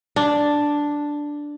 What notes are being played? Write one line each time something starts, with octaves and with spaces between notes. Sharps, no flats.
D4